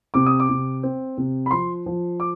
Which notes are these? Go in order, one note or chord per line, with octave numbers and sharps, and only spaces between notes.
C3 D6
D#6
D6
C3
C4
C3
B5
F3 C6
F3
D6